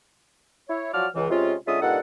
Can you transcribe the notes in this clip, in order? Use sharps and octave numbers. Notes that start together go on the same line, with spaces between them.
E4 C#5
F3 F#3 F#4 D5 F6
C#2 E3
C3 G#3 C#4 F4
D3 G#3 C#4 F4 E5 D#6
G2 A#2 D#4 A4 F#5